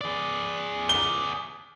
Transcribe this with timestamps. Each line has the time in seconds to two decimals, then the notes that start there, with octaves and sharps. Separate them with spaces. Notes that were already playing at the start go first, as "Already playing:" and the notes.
0.01 G#4 D5
0.89 G7